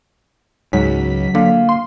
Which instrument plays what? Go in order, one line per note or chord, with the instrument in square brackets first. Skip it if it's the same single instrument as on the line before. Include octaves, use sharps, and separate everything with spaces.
[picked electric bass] C#2 [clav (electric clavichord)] G#2 [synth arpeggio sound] F#3 B6
[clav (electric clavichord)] D3 [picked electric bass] A#3 [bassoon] F4
[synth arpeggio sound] C6